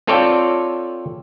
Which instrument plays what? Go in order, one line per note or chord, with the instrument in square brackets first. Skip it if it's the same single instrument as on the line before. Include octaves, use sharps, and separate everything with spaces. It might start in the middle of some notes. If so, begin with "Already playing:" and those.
[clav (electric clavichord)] C4 F4 A4 C#5 D5 G5